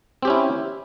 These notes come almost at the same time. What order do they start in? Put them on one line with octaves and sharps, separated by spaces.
C4 G4 C#4 E4